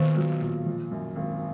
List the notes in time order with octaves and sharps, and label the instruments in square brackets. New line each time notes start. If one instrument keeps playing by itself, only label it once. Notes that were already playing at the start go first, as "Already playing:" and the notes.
Already playing: [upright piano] B1 A#2 F#3 B3 [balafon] D#3
[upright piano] F#3
A#2
F3
F#2
G#1